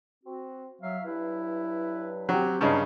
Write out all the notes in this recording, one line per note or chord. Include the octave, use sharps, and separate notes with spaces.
C4 F#4
F#3 E5 F5
G2 F#3 E4 B4
F#3 C4 G4
G2 C#3 F#3 D4 D#4